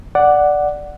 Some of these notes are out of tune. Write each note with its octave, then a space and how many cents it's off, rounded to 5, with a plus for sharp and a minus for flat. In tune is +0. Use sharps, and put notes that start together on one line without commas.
D5 +0 F#5 +0